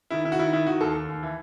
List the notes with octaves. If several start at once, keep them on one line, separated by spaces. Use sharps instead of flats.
D#3 E4
D#3 E4
F#4
D#3 E4
D#3 E4
D#3 F#4
D#2 A4
D#2
D#2
E3